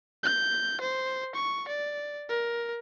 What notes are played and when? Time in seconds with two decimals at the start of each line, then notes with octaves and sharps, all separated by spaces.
0.24 G6
0.81 C5
1.35 C#6
1.68 D5
2.29 A#4